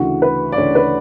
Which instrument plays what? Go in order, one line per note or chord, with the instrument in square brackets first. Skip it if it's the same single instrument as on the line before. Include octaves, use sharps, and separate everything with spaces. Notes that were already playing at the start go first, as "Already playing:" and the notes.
Already playing: [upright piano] D2 C#3 E3 F#4
B4
D5
D2 C#3 E3 C#5
B4